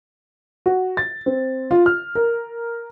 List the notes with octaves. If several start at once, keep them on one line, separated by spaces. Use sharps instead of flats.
F#4
A6
C4
F4
F6
A#4